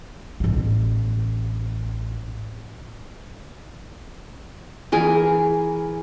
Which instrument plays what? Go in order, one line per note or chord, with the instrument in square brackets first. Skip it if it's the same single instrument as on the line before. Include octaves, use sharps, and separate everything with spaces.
[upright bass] A1 B3
[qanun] E3 G#4 A#4